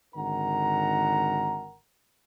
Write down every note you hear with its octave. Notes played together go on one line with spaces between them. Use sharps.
G#1 D3 D#4 A#4 F#5 A#5